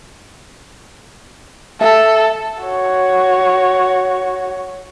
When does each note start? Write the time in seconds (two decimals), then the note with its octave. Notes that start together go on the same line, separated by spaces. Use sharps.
1.81 A4 E5 A5
2.64 F#4 C#5